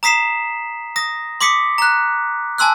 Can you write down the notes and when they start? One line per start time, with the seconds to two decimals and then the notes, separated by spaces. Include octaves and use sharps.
0.03 A#5 D#6 B6 C7 E7
0.96 D#6 A#6
1.41 C6 D6 D#6 B6 C#7
1.78 A#5 F#6
2.58 G#5 A5 C6 E6 F#6